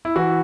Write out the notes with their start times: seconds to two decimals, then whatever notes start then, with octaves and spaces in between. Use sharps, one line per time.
0.05 E4
0.16 E3 F#4